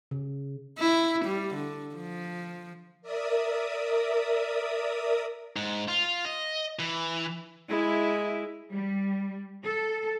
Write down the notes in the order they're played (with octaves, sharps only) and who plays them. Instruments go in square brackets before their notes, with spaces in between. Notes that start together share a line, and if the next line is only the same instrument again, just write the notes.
[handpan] C#3
[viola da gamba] E4
G3
D3
F3
[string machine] A#4 D5 E5 D#6
[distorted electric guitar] G#2
F4
D#5
E3
[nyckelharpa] G#3 [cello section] E4
[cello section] G3
A4